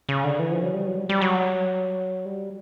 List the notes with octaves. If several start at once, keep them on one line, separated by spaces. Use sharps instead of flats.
C#3
D3
E3
F3
F#3
G3
F#3
G3
G3
F#3
G3